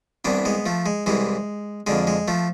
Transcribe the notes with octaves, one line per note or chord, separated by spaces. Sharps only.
C2 C3 E3 B3 D4
G#3 B3
F3 A3
G#3
C2 C3 E3 G#3
F2 D3 G#3
G#3
F3 A3